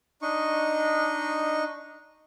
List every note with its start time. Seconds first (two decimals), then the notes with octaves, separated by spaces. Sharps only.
0.22 D4 D#4 D#5 C#6